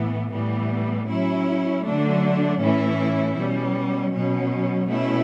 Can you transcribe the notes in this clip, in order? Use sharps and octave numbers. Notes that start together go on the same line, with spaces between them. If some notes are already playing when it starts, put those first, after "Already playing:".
Already playing: A2 E3 B3
A2 E3 G3 B3
F#3 C#4 E4
D3 F#3 A3 D4
A2 E3 A3 C#4 E4
B2 G3 C#4
B2 F#3 C#4
B2 A3 C#4 E4